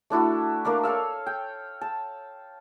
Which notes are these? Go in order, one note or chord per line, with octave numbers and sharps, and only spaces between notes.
A3 D4 E4 F#4
A#3 D4 A#4 D5
A4 C#5 F5 E6
G5
A5